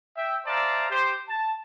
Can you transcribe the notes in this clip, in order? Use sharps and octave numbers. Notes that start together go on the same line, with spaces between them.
E5 G5
C5 D5 E5 F5 A5 A#5
G4 C5
A5